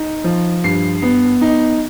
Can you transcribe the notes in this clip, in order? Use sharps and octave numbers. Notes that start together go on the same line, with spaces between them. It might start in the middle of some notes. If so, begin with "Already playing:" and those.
Already playing: D#4
F3
G2 C7
B3
D#4